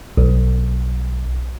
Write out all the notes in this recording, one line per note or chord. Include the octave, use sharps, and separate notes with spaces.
B1